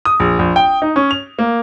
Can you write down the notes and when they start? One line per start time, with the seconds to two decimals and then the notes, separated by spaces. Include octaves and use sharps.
0.05 D#6
0.20 A#1
0.39 A#1
0.56 G5
0.82 D#4
0.96 C#4
1.11 F7
1.39 A#3